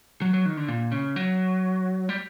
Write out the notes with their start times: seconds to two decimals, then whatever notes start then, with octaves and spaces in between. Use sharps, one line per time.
0.21 F#3
0.34 F#3
0.46 D#3
0.57 D3
0.68 A#2
0.92 C#3
1.16 F#3
2.09 G3